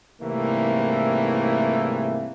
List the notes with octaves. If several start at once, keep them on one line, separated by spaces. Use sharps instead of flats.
C2 G#2 C3 E3 A3 A#3